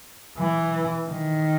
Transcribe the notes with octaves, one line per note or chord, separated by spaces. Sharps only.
E3
D#3